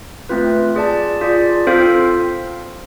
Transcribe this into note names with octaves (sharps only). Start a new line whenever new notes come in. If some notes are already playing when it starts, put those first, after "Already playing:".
A3 C4 F4 B4
F4 G#4 D5 A5
F4 G#4 D5
C4 F4 A4 C5 F5